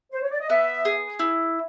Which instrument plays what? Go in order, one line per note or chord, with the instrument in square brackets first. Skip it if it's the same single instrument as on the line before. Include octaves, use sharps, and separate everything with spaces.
[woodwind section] C5
C#5
D5
D#5
[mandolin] B3 [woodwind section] E5
[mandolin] G#4
E4